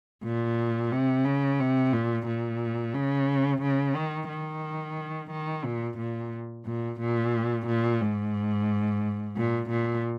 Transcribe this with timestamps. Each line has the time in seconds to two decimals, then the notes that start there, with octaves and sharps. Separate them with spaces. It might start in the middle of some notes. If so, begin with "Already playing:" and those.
0.24 A#2
0.92 C3
1.25 C#3
1.60 C3
1.93 A#2
2.27 A#2
2.94 C#3
3.62 C#3
3.95 D#3
4.29 D#3
5.31 D#3
5.65 A#2
5.98 A#2
6.66 A#2
7.00 A#2
7.67 A#2
8.01 G#2
9.36 A#2
9.70 A#2